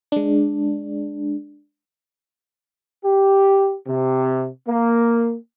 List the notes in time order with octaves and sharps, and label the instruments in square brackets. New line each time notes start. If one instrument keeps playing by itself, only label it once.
[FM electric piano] G#3 D4
[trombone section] G4
C3
A#3